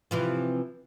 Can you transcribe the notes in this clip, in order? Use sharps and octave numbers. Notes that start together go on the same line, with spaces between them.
C3 E3 F3